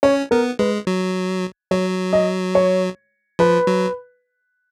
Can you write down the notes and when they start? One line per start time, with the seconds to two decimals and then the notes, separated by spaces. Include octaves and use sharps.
0.03 C#4 C#5
0.31 B3 A#4
0.59 G#3 B4
0.87 F#3
1.71 F#3 C#5
2.13 D#5
2.55 C#5
3.39 F3 B4
3.67 F#3